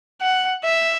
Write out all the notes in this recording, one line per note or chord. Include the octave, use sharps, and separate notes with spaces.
F#5
E5